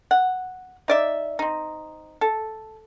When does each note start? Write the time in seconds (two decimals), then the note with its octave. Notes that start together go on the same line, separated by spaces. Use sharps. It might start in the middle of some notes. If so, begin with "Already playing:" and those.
0.11 F#5
0.88 D#4 D5 E5
1.39 C4 D#4
2.21 A4